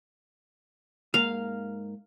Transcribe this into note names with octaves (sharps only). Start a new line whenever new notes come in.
G#2 A#3 F5